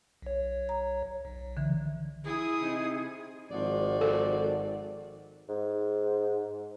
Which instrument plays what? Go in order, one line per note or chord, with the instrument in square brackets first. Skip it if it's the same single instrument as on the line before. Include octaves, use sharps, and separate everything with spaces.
[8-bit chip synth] B1 C#5
[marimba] A#5
[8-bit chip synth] B1
[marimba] D3 E3
[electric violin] E4 D#6 [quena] G#4
[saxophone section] C3 D#4
[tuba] G#1 [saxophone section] F3 F#4 D5
[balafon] A4
[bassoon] G#2